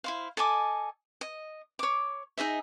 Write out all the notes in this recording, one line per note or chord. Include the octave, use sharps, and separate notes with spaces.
E4 C5 F5
A4 D#5 G#5 D6
D#5
C#5 D6
D#4 G#4 D#5 E5